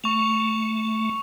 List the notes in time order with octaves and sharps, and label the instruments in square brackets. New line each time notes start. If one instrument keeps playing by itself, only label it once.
[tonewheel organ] A3 [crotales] C#6 F7